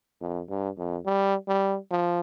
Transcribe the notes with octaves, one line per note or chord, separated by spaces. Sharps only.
F2
G2
F2
G3
G3
F3